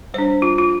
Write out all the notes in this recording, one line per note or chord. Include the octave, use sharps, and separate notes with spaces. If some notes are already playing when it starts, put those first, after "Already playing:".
G3 D4 C5
F4
F4